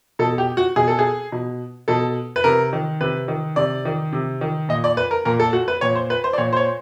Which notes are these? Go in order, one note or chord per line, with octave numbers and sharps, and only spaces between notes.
B2 A4
G4
F#4
B2 G#4
A4
G#4
B2
B2 A4
B4
C3 A#4
D#3
C3 B4
D#3
C3 D5
D#3
C3
D#3
A#2 D#5
D5
B4
A#4
A#2 A#4
A4
F#4
B4
A#2 C#5
C5
B4
C5
D5
A#2 C#5
C5
C#5